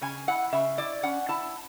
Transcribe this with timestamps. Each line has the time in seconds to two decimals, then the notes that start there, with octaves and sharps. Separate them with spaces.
0.01 C#3 G#5
0.27 E4 F#5
0.53 C#3 E5
0.78 E4 D5
1.03 C#4 F#5
1.28 E4 A5